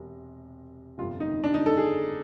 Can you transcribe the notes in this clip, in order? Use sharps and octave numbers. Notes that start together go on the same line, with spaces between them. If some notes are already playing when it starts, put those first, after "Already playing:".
Already playing: E1 C3
G1 F2 C3 F4
D#4
D4
D#4
A4
G#4